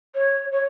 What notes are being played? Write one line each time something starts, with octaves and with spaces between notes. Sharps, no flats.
C#5
C#5